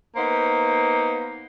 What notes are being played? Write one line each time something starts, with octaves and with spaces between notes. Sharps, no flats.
A#3 B3 D#4 C5